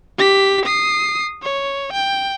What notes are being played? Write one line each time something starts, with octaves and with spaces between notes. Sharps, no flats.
G4 B6
D#6 C7
C#5
G5